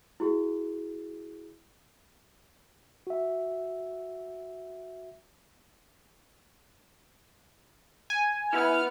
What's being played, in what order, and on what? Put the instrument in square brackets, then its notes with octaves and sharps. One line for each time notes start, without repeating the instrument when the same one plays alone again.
[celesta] E4 F#4 G#4
[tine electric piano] F#4 E5
[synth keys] G#5
[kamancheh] B3 [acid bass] E4 [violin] F6